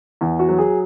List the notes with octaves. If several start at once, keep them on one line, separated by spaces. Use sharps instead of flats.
E2
F#4
F#3
G#4